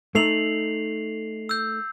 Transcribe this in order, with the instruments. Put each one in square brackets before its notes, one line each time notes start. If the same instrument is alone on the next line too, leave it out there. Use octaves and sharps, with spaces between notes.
[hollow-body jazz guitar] A3 D#4 [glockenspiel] C7 F7 F#7
[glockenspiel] E6 G6